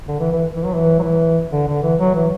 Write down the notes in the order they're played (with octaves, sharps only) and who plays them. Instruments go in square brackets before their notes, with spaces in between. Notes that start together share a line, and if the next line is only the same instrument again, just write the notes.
[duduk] D3
E3
E3
E3
F#3
E3
F#3
E3
D3
D3
E3
F#3
E3